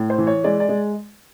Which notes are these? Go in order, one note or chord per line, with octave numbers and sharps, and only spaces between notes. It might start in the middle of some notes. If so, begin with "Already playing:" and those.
Already playing: A2
C5
E3
C#5
G#3 D5
D5
G#3